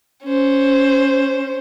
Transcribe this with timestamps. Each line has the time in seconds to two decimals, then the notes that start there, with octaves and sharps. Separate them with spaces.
0.24 C#4 C5